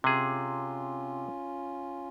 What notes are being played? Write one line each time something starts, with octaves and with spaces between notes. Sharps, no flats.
C3 C#4 F4 G#4